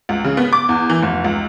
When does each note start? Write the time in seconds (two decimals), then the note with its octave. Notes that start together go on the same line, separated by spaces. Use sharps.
0.09 C#2
0.24 C#3
0.37 B3
0.53 D6
0.69 E2
0.90 E3
1.02 F1
1.24 C#2